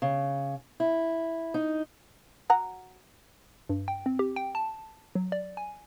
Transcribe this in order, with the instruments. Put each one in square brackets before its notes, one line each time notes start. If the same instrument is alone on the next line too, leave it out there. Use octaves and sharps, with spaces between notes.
[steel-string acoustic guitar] C#3
E4
D#4
[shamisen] F#3 F#5 A#5
[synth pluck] G2
G5
C4
G4
G5
A5
F#3
D5
G#5